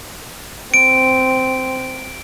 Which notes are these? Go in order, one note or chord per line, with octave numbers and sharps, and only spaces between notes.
C4 D7